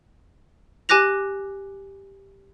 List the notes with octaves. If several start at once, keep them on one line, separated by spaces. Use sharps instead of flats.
G4 G#5 D6 F#6 A#6 F7